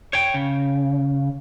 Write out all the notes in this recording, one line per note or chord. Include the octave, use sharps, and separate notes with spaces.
C#5 G5
C#3